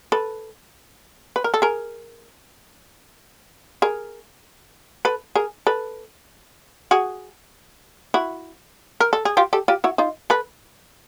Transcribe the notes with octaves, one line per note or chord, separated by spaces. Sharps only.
A4 B4
B4
A#4
A4
G#4 A#4
G#4 A#4
A4 B4
G#4 A#4
A4 B4
F#4 G#4
E4 F#4
A#4
A4
G#4
F4 G4
G4 A4
F4 G4
E4 F#4
D#4 F4
A4 B4